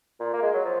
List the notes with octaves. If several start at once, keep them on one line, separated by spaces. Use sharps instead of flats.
A#2
A#3
G#3
F#3
F3